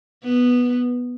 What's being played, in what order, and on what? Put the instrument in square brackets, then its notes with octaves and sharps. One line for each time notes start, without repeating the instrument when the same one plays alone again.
[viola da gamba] B3